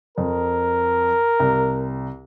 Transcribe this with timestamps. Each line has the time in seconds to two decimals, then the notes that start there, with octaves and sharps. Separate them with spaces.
0.18 F2 A#4
1.40 C2